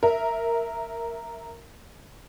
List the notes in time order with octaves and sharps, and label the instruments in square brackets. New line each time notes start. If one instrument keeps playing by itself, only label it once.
[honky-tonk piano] A#4 E5